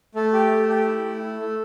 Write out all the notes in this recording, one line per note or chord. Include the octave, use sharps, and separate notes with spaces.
A3 A4
G4
A3
G4 A4
E4
A3
E4
A3